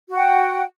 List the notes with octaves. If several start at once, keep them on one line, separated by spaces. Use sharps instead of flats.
F#4 F#5 G5